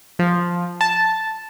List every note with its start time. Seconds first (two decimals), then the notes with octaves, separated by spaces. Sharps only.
0.19 F3
0.81 A5